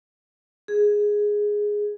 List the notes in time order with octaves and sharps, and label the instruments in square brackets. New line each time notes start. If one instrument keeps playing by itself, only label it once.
[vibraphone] G#4